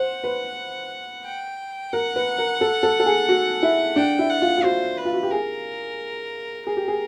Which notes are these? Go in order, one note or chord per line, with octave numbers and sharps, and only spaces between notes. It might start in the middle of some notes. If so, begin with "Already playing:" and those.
Already playing: C5 F#5
B4
G5
A#4 F#5
B4
A#4
A4
A4
A4
G#4
F#4
E4
D4 G5
E4
F#5
F4
F4
F#4 C5
B4
F4
F#4
G4
G#4 A#4
G#4 A#4
G4
G#4